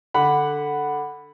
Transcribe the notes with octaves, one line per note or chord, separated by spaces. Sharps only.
D3 F#5 B5